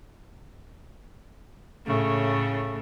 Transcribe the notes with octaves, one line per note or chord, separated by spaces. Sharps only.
A2 C#3 A3